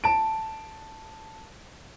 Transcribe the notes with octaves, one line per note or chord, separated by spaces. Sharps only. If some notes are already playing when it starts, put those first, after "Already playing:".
A5 D7